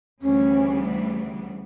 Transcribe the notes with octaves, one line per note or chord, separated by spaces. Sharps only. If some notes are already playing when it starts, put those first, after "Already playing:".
D2 C#3 E3 G3 B3 C#4